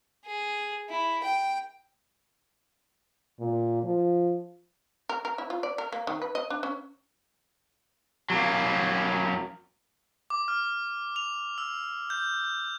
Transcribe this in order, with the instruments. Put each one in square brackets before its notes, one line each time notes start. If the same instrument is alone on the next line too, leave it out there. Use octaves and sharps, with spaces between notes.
[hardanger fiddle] G#4
E4
G5
[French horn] A#2
F3
[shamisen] A#4
A#4
E4
F4
D5
A#4
A#3
D#3
B4
D#5
D4
C#4
[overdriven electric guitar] F#3 A#3
[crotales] D6
F6
F7
E6
G6